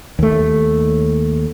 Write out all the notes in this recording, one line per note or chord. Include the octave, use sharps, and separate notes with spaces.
D#2 A3